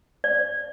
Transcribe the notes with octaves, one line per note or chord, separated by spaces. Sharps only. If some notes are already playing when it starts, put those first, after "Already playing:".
D5